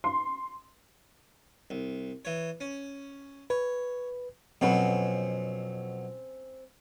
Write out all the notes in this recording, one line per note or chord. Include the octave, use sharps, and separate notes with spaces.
C6
C2
E3 C#5
C#4
B4 C#5
F2 B2 F#3 C4 C#4 B4